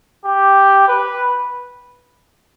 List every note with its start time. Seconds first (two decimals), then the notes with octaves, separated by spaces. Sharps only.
0.25 G4
0.88 B4